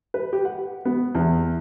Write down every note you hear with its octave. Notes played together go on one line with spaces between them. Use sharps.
B4
G4
F#5
B3
E2